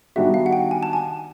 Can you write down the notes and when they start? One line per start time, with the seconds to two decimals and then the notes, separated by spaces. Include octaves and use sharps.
0.16 D#3 G3 B3 D4 F#4 E5
0.34 F5
0.46 F#5
0.53 G5
0.71 G#5
0.83 A5
0.93 G#5